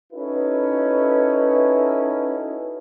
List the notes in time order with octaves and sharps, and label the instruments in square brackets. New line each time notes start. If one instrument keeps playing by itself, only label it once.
[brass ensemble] C#4 D#4 E4 F#4 A4 B4